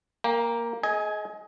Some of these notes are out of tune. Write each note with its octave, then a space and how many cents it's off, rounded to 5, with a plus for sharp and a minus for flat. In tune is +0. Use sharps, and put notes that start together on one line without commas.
A#3 +0 G5 +35 A#5 +35
G#4 +35 D#5 +20 G#5 +0